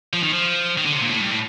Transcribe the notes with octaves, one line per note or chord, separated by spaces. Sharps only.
F3
D#3
F3
D#3
D3
C3
A#2
A2
G2
A2